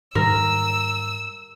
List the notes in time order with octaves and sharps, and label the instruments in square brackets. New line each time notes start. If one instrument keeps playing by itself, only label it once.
[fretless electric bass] G#2 D#3 G3 [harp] A#4 [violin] E6